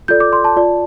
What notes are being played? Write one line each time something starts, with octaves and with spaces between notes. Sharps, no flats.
F4 A4 D5 G6
D6
C6
A5
F4 D5